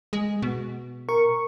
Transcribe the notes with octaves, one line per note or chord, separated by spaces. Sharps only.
G#3
B2
A#4 C#6